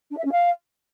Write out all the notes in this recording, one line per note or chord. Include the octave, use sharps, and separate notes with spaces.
D4
E5
C#4
F5